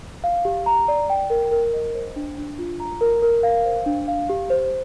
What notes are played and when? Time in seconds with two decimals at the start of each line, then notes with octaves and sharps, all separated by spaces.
0.24 F5
0.45 G4
0.66 A#5
0.88 D5
1.10 G5
1.30 A#4
1.51 A#4
1.73 D#5
1.94 C5
2.16 D4
2.37 D4
2.58 F4
2.80 A#5
3.01 A#4
3.22 A#4
3.43 F5
3.65 C5
3.86 D4
4.08 F5
4.30 G4
4.50 C5